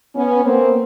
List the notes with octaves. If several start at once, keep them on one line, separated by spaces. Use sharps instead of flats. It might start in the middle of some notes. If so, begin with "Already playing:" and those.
B3 C#4
A#3 C4